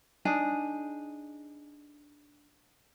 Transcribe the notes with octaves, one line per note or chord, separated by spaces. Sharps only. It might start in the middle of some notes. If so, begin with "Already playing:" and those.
D4 D#4 G#4